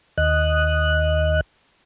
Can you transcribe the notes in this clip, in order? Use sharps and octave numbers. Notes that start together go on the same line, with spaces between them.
D#2 D#5 F#6